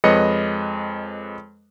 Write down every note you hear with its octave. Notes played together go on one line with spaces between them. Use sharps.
F2 G#3 B4 C#5 D#5 C#7